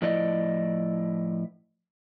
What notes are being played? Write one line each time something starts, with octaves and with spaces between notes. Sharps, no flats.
A2 F3 E4 D5 D#5